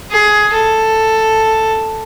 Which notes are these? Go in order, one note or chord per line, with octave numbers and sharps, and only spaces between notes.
G#4
A4